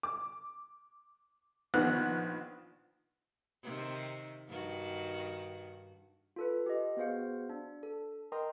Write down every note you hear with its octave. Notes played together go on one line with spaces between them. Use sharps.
D6
A#1 D#3 B3 C5 F#5 F#6
C3 D#3
G2 D#3 F#4
F4 A4 B4
G4 D#5
B3 F#4 G#4 C5 F5 C#7
D4
A4
A#4 D#5 G5 A#5 C6 D#6